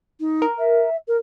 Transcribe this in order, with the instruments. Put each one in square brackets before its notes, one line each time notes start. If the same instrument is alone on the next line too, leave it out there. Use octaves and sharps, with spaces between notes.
[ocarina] D#4
[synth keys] A#4
[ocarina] E5
A#4